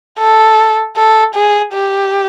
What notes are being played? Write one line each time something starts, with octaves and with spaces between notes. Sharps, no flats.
A4
A4
G#4
G4